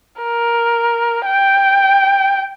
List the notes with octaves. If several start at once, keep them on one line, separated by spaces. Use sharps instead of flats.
A#4
G5